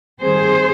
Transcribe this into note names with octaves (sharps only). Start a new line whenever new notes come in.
D#3 G3 C4 G#4 C5